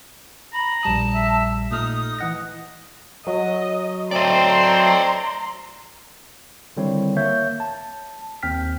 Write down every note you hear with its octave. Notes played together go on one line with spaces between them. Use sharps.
A#5 B5
A#1 G3 A5 D#6
E5
A#2 A3 D#4 D#6 F6
E3 D#5 F#5 A#6
F#3 D#5
A3 C4 D5 D#5 A#5 C6
D3 D#3 G3 C4 E4 C#5
A#3 C#5 E5 G6
A5
D#2 C4 G5 F6 B6